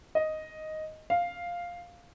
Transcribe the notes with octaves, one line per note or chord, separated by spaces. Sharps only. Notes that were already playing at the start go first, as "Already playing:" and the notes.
D#5
F5